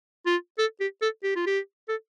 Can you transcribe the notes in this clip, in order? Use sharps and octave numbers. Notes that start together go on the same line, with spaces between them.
F4
A4
G4
A4
G4
F4
G4
A4